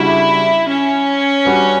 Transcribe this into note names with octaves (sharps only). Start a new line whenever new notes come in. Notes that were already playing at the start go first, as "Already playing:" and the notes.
Already playing: C#3 G3 D4 E4 F#4
C#4
G3 D4 F#4 B4